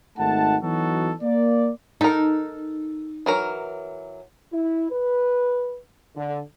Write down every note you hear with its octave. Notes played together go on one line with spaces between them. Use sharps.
G#1 A3 D#4 F#5 A5
E3 F#3 B3 D#4 F#4 A4
A#3 D5
D#4 A4 A#4
E3 F#3 A#4
E4
B4
D3